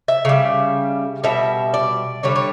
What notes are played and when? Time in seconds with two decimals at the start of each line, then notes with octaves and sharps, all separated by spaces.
0.08 E5
0.25 C#3 G3
1.24 B2 G3 E5
1.74 D5
2.23 D3 G3 C#5
2.36 C#5